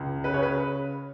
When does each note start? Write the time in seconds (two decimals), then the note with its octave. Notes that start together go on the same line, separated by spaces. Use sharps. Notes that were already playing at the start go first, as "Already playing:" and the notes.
Already playing: C#2
0.24 C#3 B4
0.34 C#5
0.43 B4